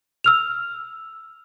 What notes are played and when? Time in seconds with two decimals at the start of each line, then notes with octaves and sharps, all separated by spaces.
0.24 E6 F6 F7